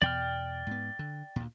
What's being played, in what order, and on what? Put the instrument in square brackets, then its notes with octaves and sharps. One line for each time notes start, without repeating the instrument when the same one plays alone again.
[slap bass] E2 B2 [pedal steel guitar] D5 G5 F6
[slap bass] G#2 B3
D3
D2 A#2